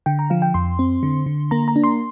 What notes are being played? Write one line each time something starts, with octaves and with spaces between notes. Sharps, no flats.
D3 G5
A#5
F3 F5
G5
F2 C6
C4
D3
D3
A#3 A#5
A#5
D4
C6